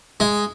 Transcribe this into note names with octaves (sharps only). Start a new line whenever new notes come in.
G#3